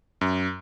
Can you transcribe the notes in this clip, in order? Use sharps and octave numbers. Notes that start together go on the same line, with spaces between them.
F#2